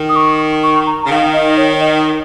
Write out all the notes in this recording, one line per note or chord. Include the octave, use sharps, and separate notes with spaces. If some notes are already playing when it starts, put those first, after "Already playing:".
Already playing: D#3
D#6
C#6
C#6
A#5
C#3
D#3 F5
D#5
C#5
D#5